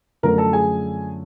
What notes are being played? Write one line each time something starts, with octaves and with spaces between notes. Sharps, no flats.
F#2 D3 F3 A3 A#4 A#5
A4 A5
G#4 G#5